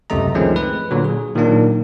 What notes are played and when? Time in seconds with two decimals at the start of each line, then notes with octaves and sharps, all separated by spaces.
0.10 C#2 F#2 C3 A3 D#5 A#5
0.35 D#3 F3 G#3 A3 C4 C#4
0.56 B4
0.91 A#2 D3 F#3
1.04 G#4
1.35 A#2 D#3 F#3 A#3 D4